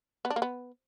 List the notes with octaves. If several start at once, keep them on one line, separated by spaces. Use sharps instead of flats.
B3
D4
A#3
B3